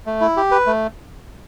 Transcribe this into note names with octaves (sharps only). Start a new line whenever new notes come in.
A3
E4
G4
B4
A3